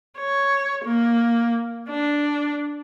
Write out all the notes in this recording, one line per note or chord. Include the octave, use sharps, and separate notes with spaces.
C#5
A#3
D4